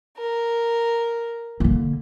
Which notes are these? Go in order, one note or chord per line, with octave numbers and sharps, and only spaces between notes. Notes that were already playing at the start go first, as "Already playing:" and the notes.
A#4
D3 A#3